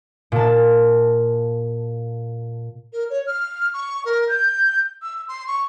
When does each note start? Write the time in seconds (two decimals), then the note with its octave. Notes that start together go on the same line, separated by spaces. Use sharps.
0.32 A#2 A5
2.92 A#4
3.10 C#5
3.26 F6
3.73 C#6
4.05 A#4
4.28 G6
5.02 E6
5.28 C6
5.47 C#6